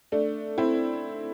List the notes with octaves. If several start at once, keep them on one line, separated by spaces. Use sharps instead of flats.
A3 D4
C4 E4